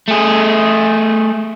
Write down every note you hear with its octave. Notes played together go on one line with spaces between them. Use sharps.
A3 G#4